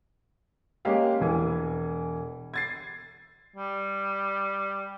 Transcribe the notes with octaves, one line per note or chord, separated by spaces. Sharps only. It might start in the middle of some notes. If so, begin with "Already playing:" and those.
G#3 A#3 C#4 G4 F5 G5
E1 E3 G#5
G#6 A6 C7
G3